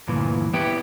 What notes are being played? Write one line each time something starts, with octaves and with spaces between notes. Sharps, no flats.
D2 G2 A#2 E3
B3 E4 G4